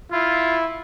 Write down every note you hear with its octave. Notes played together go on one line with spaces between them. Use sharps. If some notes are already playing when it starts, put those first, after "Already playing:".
E4 F4